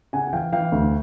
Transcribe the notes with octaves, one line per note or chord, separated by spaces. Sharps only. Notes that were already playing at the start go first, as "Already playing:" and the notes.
C#3 F#5 G#5
G#5
E3 F5 G5
E3 F5 G5
D2